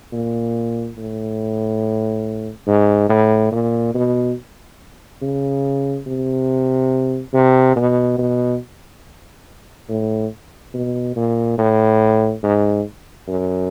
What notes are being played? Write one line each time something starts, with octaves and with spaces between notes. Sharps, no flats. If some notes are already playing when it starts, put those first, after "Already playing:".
A#2
A2
G#2
A2
A#2
B2
C#3
C3
C3
B2
B2
A2
B2
A#2
A2
G#2
F#2